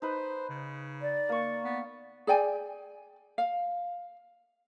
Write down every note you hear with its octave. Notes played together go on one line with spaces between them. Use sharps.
D#4 B4 C5
C#3
D5
A#3 C#6
B3
G#4 D5 G5 G#5
F5